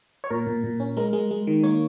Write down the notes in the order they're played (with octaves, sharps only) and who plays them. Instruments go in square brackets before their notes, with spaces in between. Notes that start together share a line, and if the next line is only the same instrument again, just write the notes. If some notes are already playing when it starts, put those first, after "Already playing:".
[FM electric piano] C#5
A#2 A#4
A#2
A#2
C#4
G#3 A#4
G#3
G#3
D#3
A#3 C#5